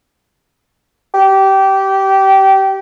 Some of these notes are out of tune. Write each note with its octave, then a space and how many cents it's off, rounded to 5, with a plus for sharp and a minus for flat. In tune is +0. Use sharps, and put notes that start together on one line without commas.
G4 -20